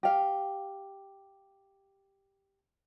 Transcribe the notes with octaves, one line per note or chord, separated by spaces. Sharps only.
G4 F5